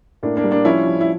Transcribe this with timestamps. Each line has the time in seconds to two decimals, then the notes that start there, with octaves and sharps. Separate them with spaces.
0.23 A2 A#3 D4
0.37 A#3 D4
0.44 G3
0.51 A#3 D4
0.65 F3 C#4 E4
0.86 F3
1.01 E4